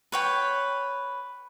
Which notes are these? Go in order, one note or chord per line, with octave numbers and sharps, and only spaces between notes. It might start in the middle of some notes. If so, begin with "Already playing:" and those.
B4 C#5 G5